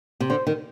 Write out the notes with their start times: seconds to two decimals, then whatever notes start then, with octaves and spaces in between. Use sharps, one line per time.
0.20 C3
0.30 D3 C5
0.47 D#3